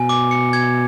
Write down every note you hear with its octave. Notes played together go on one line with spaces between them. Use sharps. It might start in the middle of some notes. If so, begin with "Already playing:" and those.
Already playing: B2 G#5
D6
C#7
G#6